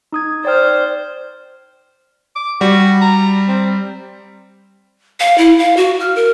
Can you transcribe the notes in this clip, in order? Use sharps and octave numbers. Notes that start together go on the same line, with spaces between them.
D#4 D#6 G#6
C5 D5 G5 F6
D6
G3 F#4
A#5
C4
F5
E4
F5
F#4
F6
A#4